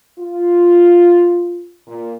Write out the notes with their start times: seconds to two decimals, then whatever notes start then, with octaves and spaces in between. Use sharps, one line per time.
0.19 F4
1.87 A#2